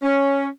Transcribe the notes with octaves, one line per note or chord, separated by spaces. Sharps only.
C#4